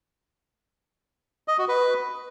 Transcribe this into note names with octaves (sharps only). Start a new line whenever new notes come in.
D#5
F#4
B4